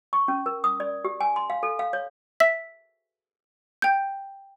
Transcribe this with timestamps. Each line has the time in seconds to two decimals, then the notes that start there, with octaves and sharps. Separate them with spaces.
0.13 C#6
0.28 C#4
0.46 A#4
0.64 D#6
0.80 D5
1.05 G4
1.21 G#5
1.36 C6
1.50 F5
1.63 A4
1.79 F5
1.93 C#5
2.40 E5 B6
3.82 G5 G6